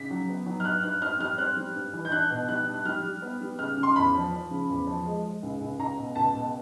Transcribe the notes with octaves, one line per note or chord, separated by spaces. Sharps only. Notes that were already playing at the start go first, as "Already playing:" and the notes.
Already playing: C#3 B6
F#3
B3
F#3
F6
G2 F#6
G2 F#6
C4 F6
G3 F6
C4 F#6
G3
G2
E3
G6
D4 F#6
B2
G3 F#6
D4
F#6
G3 F6
G3
B3
G3
C#3 F6
C#3
C6
E2 B5
F3
F3
C#3
E2
F3
G#3
G#3
C#2
C#2
C#2 A#5
B2
C#2 A5
B2